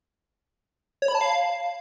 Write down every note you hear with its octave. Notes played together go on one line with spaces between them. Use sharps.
C#5
B5
A5
F5